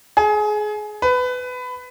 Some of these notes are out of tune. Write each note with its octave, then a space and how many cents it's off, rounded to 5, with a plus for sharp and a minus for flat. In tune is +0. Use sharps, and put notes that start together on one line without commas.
G#4 +25
B4 +20